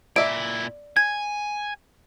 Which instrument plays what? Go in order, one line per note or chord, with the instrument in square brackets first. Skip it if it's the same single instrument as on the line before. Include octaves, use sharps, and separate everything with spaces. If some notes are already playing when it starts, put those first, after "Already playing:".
[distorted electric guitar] A#2 E4 [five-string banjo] D5 E5 [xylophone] D7
[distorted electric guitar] G#5 [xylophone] G#6